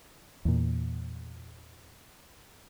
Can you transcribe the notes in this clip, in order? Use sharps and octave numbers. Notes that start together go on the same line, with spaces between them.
E2 A#2